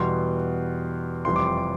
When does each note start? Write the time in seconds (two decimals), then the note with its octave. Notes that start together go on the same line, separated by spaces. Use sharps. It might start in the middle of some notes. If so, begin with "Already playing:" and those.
Already playing: E2 B2 G3 C6
1.25 F1 F2 E3 G3 C6
1.36 D6
1.47 C6
1.57 D6